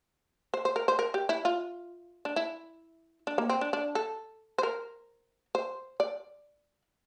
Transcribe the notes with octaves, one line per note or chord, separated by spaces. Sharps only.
C5
C5
A#4
C5
A#4
G4
E4
F4
D4
E4
D4
A#3
C4
D4
D4
A4
C5
A#4
C5
D5